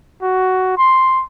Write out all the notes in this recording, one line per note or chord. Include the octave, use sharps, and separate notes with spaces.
F#4
C6